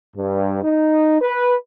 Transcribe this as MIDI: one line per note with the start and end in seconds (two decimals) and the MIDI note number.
0.17 0.62 43
0.63 1.18 63
1.20 1.54 71